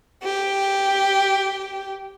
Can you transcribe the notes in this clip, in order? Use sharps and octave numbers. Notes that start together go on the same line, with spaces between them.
G4